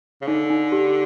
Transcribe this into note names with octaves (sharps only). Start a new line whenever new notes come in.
C#3
D3 D#4
D#4
G4